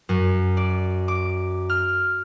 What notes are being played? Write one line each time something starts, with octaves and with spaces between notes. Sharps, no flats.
F#2
D5
D6
F6